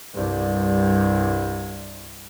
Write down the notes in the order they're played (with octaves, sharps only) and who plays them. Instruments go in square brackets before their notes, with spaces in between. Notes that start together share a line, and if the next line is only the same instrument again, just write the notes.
[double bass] C2 G2